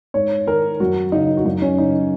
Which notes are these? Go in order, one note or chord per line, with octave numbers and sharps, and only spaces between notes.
G#2 C#5
D#3 A#4
F#2 F#4
C#3 D#4
F#4
F#2 D#4
C#4
C#3 D#4